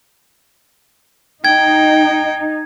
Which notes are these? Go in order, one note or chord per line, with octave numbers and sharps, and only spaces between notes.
D#4 G5 G#6